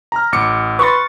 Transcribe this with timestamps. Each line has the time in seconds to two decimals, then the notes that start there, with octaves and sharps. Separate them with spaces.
0.12 A#5 F6
0.32 A1 D6 C#7
0.79 B4 C6 C#6 A6